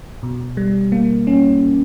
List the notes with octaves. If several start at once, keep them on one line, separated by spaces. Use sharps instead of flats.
B2
G3
A#3
C#4